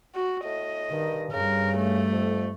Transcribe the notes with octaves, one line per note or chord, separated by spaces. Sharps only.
F#4
A2 D#5
G2 D#3
G2 C#3 G3 A#4
A3
F2